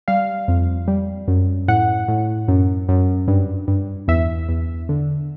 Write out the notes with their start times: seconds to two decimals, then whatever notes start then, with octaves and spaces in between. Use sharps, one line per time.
0.08 G3 F5
0.48 F2
0.88 G3
1.28 F#2
1.68 A2 F#5
2.08 A2
2.48 F#2
2.89 F#2
3.28 G2
3.68 G2
4.08 E2 E5
4.49 E2
4.89 D3